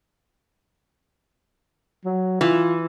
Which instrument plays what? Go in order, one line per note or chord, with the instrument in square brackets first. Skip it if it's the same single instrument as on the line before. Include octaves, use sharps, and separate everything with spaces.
[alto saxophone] F#3
[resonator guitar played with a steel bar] E3 [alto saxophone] F4